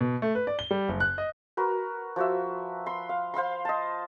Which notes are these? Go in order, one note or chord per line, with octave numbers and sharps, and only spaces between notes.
B2
A3
B4
D5
G7
G3
F#1
F#6
D#5
F#4 A#4 B4
F3 F#4 E5
B5 C6
F5
C5 F5 B5 C6
D#5 A5